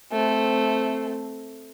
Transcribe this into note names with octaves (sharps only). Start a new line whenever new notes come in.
A3 C4